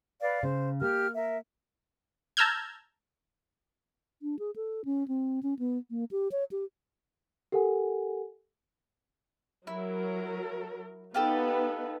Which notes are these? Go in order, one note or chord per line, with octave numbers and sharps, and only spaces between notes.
B4 D5 F5
C#3 C5
A#3 G4 F6
A#4 E5
A5 A#5 E6 F6 G6 G#6
D4
G#4
A4
C#4
C4
C#4
B3
A#3
G4
C#5
G4
G4 A4 A#4 F#5 G#5
F#3 E4 A#4
B3 D#4 F4 G4 A4 B4